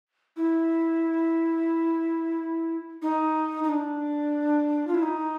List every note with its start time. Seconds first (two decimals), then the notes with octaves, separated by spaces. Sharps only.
0.37 E4
3.02 D#4
3.64 D#4
3.69 D4
4.87 F4
4.94 E4
5.02 D#4